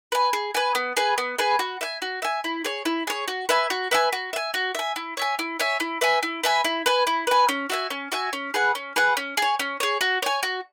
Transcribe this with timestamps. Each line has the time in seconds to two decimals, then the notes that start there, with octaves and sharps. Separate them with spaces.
0.12 B4 G#5
0.33 G#4
0.54 B4 G#5
0.75 B3
0.97 G#4 B4 G#5
1.18 B3
1.38 G#4 B4 G#5
1.59 F#4
1.81 E5 G#5
2.02 F#4
2.22 E5 G#5
2.44 E4
2.64 G#4 C#5
2.85 E4
3.07 G#4 C#5
3.28 F#4
3.49 B4 E5 G#5
3.70 F#4
3.91 B4 E5 G#5
4.13 F#4
4.33 E5 G#5
4.54 F#4
4.75 E5 G#5
4.96 E4
5.17 C#5 E5 G#5
5.39 E4
5.59 C#5 E5 G#5
5.80 E4
6.01 B4 E5 G#5
6.23 E4
6.43 B4 E5 G#5
6.64 E4
6.86 B4 G#5
7.07 E4
7.27 B4 G#5
7.49 C#4
7.70 F#4 E5 G#5
7.90 C#4
8.12 F#4 E5 G#5
8.33 C#4
8.54 G#4 B4 F#5
8.75 C#4
8.96 G#4 B4 F#5
9.17 C#4
9.37 G#4 C#5
9.59 C#4
9.80 G#4 C#5
10.01 F#4
10.22 C#5 G#5
10.43 F#4